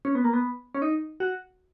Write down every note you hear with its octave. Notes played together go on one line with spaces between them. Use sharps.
C#4
B3
A#3
B3
C#4
D#4
F#4